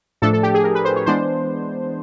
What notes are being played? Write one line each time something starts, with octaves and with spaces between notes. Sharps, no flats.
A2 F3 A3 D4 A4
A4
G4
G#4
A#4
B4
C5
C#5
E3 G#3 B3 D4 C5